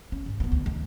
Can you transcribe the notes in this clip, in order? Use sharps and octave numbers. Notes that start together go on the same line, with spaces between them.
C#4
G#2
G2 B3
D2
D#3